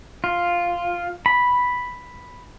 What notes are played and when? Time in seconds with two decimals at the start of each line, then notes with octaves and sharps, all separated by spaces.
0.24 F4
1.26 B5